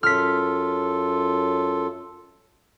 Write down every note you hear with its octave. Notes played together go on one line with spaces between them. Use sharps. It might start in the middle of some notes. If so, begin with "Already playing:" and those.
F#2 F4 A4 F6 B6